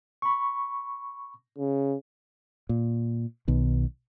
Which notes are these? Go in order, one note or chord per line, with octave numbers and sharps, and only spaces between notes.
B5 C#6
C#3
A#2
B1 B2 D#3